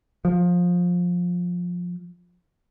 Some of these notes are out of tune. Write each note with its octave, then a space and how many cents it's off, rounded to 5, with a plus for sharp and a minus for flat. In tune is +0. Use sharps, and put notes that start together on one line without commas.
F3 +20